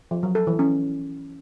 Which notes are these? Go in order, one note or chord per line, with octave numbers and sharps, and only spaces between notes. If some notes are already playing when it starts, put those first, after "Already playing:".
F3
F#3
A4
E3
C#4